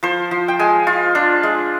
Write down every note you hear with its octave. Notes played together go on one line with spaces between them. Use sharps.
F3 C5
F3
G5
G#3 G#5
F4
D4
G#3